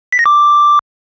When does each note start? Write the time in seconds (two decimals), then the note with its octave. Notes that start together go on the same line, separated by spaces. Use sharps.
0.12 B6
0.19 A#6
0.26 D6